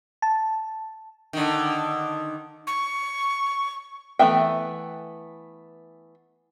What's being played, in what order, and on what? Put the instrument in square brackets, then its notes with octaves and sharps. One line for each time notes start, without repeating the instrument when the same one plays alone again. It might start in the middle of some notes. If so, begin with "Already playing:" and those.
[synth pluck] A5
[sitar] D3 D#3
[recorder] C#6
[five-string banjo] E3 A3 B3 E5 G5